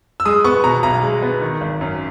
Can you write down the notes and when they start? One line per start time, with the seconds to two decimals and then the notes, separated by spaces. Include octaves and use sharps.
0.20 E6
0.25 G#3 D#6
0.44 B3 C#6
0.64 B2 A#5
0.83 B1 A#5
1.03 G#3
1.22 B3
1.42 D#3
1.61 G#1
1.81 F#2